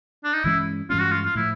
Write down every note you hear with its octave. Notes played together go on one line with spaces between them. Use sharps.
D4
D#4
G2 E3 G#3 C#4 E4
G2 E3 G#3 C#4 F4
F#4
F4
F4
A2 F3 E4